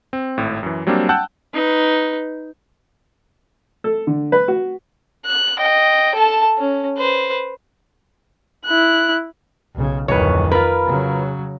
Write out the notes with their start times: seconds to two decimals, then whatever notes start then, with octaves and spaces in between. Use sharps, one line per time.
0.13 C4
0.38 G#1 A2
0.63 F#2 E3
0.87 F#3 G3 A#3 C4 D4
1.09 F#5 G5 A5 E6 F#6 G6
1.54 D#4 B4
3.84 A4
4.07 D3
4.32 B4
4.48 F#4
5.26 F#6
5.59 D#5 G5
6.15 A4 A5
6.58 C#4
6.98 B4 C5
8.66 E4 F#6
9.74 B1 C#3
10.08 D1 F2 D#3 B4 C#5
10.51 F4 A#4 B4
10.85 C#3 F#3